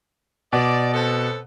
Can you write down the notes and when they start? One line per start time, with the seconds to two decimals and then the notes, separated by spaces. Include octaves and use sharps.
0.53 B2 D5
0.94 B3 C4 A4